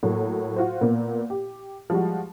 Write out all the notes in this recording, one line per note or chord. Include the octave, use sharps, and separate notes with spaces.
A2 F#3 A#3
F4 F#4 C5
A#2 A#3 B3
G4
F3 G3 G#3 F#4